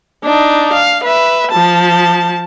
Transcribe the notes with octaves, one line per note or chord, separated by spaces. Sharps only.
D4 D#4
F5
B4 E5
F3 A5